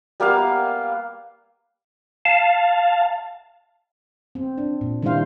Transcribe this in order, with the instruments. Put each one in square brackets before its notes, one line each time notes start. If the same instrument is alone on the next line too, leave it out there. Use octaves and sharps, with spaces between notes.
[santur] G3 A#3 B3 F5
[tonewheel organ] F5 A5
[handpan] C4
D4
A#2
D#3 G3 D4 E4 C5 F5